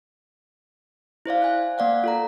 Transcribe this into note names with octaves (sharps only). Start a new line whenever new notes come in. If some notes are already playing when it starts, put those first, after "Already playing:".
E4 C5 D5 F5
G#5 F#6
A#3 D5 F5 F#5
F4 A4 A#5